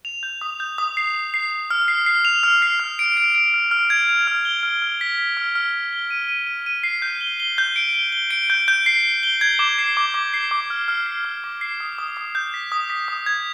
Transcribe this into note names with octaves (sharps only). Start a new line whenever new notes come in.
F7
G6
D#6
G6
D#6
C7
F7
C7
C7
F6
C7
C7
F7
F6
C7
F6
D7
D7
D7
F6
F6
G#6
F7
F6
G7
F6
F6
B6
B6
F6
F6
F6
G7
D#7
D#7
D#7
D#7
C7
G6
G7
G7
G6
D7
G7
G7
D7
G6
G6
C7
G7
G7
G#6
D6
C7
D6
D6
C7
D6
F6
F6
C7
F6
D6
C7
D#6
D#6
D#6
G6
B6
D#6
B6
D#6
G#6